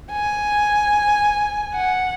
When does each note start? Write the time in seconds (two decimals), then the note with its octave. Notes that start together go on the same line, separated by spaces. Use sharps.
0.12 G#5
1.75 F#5